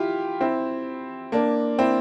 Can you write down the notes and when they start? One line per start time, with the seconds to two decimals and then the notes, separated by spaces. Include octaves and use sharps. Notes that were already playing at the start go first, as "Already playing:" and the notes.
Already playing: E4 F4 G4
0.41 C4 E4
1.32 A#3 D4
1.79 C4 E4